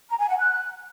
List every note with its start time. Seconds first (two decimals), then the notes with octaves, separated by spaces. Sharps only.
0.09 A#5
0.19 G#5
0.29 F#5
0.38 F#6